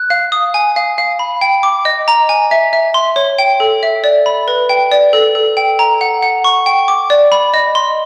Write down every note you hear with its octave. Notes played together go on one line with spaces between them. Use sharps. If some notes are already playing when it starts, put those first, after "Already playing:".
Already playing: F#6
F5
D#6
G#5
F5
F5
B5
G5
D6
D#5
A#5
G#5
E5
E5
C6
C#5
G5
A4
E5
D5
B5
B4
G5
D5
A4
A4
G5
A#5
F#5
F#5
C#6
G5
D6
D5
B5
D#5
C6